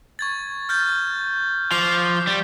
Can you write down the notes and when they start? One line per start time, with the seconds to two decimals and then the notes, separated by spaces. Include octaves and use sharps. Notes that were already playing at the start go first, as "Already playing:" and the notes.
0.19 C#6 G#6 A6
0.69 F6 G6 A6
1.71 F3 D6 F6 C7
2.27 G3